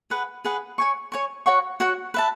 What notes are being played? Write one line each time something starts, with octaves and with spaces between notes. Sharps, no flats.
G#4 B4 F#5
G#4 B4 F#5
C#5 G#5 C#6
C#5 G#5 C#6
F#4 C#5 F#5 C#6
F#4 C#5 F#5 C#6
B4 E5 A5